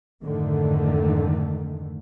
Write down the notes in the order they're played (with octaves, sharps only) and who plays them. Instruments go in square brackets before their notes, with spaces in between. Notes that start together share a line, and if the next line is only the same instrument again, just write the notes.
[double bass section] F2 G#2 D3 D#3 A3